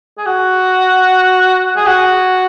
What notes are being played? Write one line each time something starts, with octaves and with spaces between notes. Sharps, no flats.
G#4
F#4
G#4
F#4